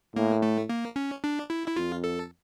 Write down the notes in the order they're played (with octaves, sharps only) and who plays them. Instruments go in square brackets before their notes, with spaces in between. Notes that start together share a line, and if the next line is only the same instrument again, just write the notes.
[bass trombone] A2 [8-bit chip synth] A#3
[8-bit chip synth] A3
A#3
C#4
D4
E4
E4
[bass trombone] F2 [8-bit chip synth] F4
[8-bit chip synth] A4